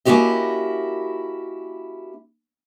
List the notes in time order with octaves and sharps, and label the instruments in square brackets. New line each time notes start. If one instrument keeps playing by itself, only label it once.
[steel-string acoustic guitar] A#3 C#4 E4 F#4 G4 D#5